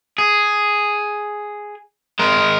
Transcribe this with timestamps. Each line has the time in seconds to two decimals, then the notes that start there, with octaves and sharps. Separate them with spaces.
0.18 G#4
2.19 G#3 A#4